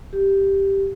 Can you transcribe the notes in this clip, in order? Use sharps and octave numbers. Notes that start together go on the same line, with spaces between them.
G4